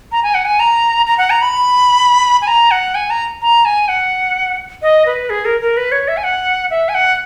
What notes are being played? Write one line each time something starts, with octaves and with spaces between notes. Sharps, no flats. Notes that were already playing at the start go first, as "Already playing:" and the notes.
A#5
G#5
F#5
G#5
A#5
A#5
F#5
A#5
B5
G#5
A#5
F#5
G#5
A#5
A#5
G#5
F#5
D#5
B4
G#4
A#4
A#4
B4
C#5
E5
G#5
F#5
E5
G#5
F#5